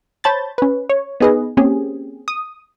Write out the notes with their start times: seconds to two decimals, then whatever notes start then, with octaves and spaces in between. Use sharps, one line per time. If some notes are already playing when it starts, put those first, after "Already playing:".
0.24 C5 C#5 A5 B5 G6 A6
0.58 C#4 B4
0.90 C#5
1.20 B3 D#4 G#4 B4 D#5
1.57 A#3 C4 C#4 G4 G#4
2.28 D#6